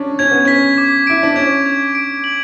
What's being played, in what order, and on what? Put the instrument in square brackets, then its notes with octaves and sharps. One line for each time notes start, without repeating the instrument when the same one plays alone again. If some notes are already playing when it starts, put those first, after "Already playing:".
Already playing: [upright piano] C#4 D4
[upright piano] C#4 [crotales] G#6
[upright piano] B3
[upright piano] C#4 [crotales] B6
[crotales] D6
[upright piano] E4 [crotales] D7
[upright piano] D4
[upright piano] C#4 [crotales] G#6
[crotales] G#6
D7
F#7